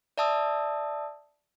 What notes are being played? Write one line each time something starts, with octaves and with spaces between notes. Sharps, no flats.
D5 E5 A5 D#6 E6